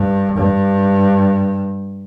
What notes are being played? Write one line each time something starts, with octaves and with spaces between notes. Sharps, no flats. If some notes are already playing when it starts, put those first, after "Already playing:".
Already playing: G2
G2